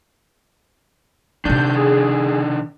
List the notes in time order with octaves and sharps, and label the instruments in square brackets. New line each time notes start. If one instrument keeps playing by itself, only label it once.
[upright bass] C3 B3 [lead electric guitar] D#3 D4 [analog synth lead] G6
[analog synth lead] G#4